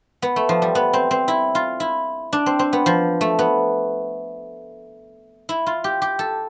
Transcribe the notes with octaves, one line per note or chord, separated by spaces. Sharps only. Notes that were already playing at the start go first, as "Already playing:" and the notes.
B3
A3
F3
G3
B3
C4
C4
E4
F4
E4
D4
C4
C4
B3
F3
A3
B3
E4
F4
G4
G4
A4